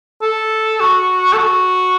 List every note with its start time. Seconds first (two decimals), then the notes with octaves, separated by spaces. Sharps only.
0.22 A4
0.80 F#4
1.33 A4
1.38 F#4